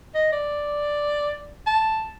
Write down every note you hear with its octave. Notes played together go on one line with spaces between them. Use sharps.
D#5
D5
A5